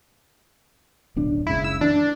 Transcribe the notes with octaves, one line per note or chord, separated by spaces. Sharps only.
D1 B1 D4
F#1 C#2 C#3 E4
E6
E3 D4